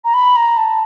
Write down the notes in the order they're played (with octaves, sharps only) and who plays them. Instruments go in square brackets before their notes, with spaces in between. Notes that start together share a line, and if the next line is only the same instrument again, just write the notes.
[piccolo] A#5
B5
A#5
A5